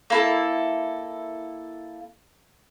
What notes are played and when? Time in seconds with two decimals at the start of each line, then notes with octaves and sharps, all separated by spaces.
0.10 A#3 E4 A4